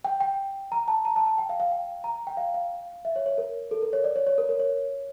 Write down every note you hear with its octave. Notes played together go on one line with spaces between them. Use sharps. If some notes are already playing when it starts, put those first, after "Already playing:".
G5
G5
A#5
A5
A#5
A5
A5
G5
F5
F5
G5
A#5
G5
F5
F5
E5
C#5
C#5
A#4
A4
A#4
C#5
D5
C#5
C#5
A#4
A#4
C#5